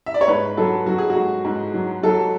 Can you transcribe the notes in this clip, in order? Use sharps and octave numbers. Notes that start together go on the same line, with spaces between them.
E5
D5
C#5
G#2 B4
F#3 A4
F#3 F#4
G#4
F#4
G#2
G#2
F#3
F#3 A4